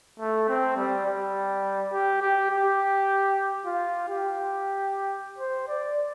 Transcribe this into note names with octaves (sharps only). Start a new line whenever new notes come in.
A3
C4
G3
G3
G4
G4
G4
F4
G4
C5
D5